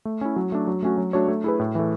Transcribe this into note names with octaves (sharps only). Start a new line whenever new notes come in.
A3
C#4 E4
F#3
A3 D4
F#3
A3 C#4 F#4
F#3
A3 D4 F#4 C#5
A3
E4 G#4 B4
A2
E3 A3